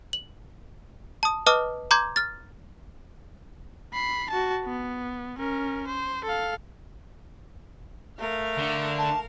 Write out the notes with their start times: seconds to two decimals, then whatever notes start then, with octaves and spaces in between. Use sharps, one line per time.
0.13 F#7
1.23 A5 D#6
1.46 B4 D#5 A5 D6 D#6 F6
1.91 A#5 C6 D6 G6 G#6
2.16 F6 A6
3.93 B5 C7
4.30 F#4 A5
4.65 B3
5.38 C#4 A#4
5.87 C5
6.24 A4 F5
8.19 A3 A#4 F5
8.58 D3
8.98 A5